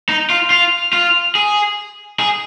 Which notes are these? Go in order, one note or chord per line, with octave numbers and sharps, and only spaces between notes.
D#4
F4
F4
F4
G#4
G#4